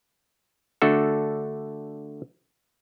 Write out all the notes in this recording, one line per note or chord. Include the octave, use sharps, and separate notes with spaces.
D3 A3 D4 F#4 A4